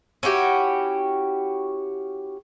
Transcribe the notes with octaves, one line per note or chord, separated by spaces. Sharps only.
C#4 E4 F#4 G4